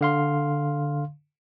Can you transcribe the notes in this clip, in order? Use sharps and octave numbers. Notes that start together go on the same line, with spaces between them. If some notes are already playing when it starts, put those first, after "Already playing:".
D3 F5 C6